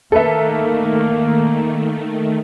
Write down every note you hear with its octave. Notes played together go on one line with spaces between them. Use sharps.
D#3 A3 A#3 A4 B4 E5